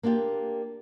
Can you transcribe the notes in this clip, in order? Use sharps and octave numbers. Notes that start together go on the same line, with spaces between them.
A#3 D4 F4 G4